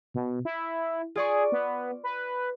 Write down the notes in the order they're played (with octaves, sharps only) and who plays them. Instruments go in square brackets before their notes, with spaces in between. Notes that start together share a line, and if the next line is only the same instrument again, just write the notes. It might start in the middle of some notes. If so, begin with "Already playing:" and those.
[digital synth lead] B2
E4
[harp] F4 D5 C#6 [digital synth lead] G#4
[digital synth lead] B3
B4